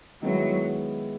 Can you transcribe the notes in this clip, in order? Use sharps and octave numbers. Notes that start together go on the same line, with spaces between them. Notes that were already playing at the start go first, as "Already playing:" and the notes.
D#3 F#3 G#3 B3 E4